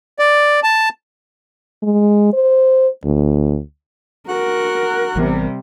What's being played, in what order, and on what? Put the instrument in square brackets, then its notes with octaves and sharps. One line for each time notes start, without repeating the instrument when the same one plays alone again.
[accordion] D5
A5
[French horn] G#3
C5
D2
[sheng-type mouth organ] F#4 F#5 F#6 [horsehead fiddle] A#4
[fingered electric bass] A1 E3 B3 [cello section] C3 G3